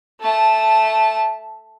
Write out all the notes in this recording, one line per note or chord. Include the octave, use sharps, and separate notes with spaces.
A3 A5